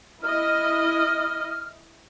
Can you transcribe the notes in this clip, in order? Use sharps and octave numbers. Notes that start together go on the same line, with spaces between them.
E4 D#5 F6